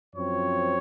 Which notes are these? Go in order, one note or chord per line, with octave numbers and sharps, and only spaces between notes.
F#2 F3 C4 C#5